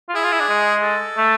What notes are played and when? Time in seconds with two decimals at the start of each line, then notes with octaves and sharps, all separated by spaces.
0.09 F4
0.15 E4 G#4
0.23 F4
0.32 E4
0.41 D4
0.49 G#3
0.83 A4
1.18 A3